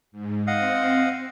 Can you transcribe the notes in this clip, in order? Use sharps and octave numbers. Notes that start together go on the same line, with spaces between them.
G#2
C4 D#5 F5 F#5